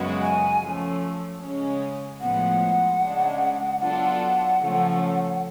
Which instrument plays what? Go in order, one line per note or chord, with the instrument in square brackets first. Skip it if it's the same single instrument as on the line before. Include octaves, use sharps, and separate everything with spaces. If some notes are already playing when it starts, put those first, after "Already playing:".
Already playing: [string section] F#2 C#3 G#3 B3 F#4
[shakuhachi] G#5
[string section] F3 A3 C#4
C#3 G#3 C#4
[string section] A2 F3 G#3 B3 [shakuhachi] F#5
[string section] C#3 G#3 D4
[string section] F#3 B3 D4 F4 A4 [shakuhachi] F#5
[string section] C#3 F3 A3 C#4